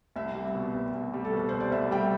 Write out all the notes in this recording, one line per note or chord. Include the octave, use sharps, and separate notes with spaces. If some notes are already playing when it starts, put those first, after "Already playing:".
C2 E5
G3
B2
C2
C2
G3
A4
B2 B4
C2 C5
D5
C2 E5
G3 G5